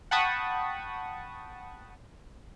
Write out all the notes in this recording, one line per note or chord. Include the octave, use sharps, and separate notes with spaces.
F#5 G5 A5 B5 C#6 D#6